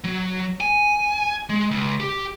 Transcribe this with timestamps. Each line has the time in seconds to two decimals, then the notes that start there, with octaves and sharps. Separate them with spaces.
0.04 F#3
0.60 G#5
1.49 G#3
1.71 C#2
2.00 G4